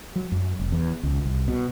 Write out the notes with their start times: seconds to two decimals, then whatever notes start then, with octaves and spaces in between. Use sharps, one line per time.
0.16 F#3
0.32 F#2
0.60 F1
0.72 E2
1.03 C#2
1.25 C2
1.48 B2